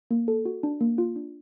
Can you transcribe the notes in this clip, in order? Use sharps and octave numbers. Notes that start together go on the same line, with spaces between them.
A#3
A4
F#4
D4
A#3
F4
D4